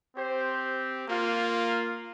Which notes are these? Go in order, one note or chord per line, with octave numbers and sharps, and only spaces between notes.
C4 G4 C5
A#3 F4